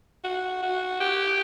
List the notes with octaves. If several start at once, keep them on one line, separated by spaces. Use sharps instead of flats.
F#4
F#4
G4